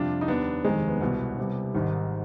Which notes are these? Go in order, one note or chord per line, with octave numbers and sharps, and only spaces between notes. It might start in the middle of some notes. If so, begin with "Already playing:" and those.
Already playing: F2 C3 G3 D4 F4
D#4
D#2 D#3 G3 B3 D4
F1 D#2 D#3 G3 G#3 C4
B3
C2 B2 G3 B3
C2 C3 G3
G#1 G#2 D#3 G3